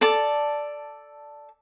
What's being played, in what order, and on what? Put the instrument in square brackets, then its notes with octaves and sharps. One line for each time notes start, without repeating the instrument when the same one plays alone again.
[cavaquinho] A4 D5 A5